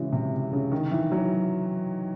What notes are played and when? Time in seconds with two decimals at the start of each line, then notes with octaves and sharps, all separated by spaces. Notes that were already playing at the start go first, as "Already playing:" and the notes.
Already playing: C#3 E3 G#3 F#4
0.12 C3
0.53 C#3
0.72 D#3
0.91 E3
1.11 F#3